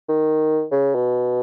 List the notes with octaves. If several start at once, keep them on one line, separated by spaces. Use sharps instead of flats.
D#3
C#3
B2